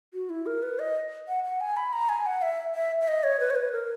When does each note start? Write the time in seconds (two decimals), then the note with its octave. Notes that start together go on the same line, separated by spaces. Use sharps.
0.14 F#4
0.30 E4
0.46 A#4
0.63 B4
0.79 D#5
1.28 F#5
1.44 F#5
1.61 G#5
1.77 B5
1.93 A#5
2.09 G#5
2.26 F#5
2.42 E5
2.75 E5
3.01 E5
3.08 D#5
3.24 C#5
3.40 B4
3.50 C#5
3.56 B4
3.72 A#4